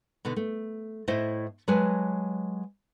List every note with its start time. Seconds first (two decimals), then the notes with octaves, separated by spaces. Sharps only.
0.25 B2 D3 D#4
0.36 A3
1.08 A2 A3 E4 C5 D#5
1.68 F#3 G#3 G4 B4 G#5 A5